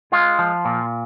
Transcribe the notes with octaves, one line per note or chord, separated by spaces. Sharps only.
G#3 F4
F3
A#2